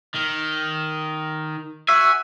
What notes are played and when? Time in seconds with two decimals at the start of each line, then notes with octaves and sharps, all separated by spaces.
0.15 D#3
1.89 F#4 E5 G#5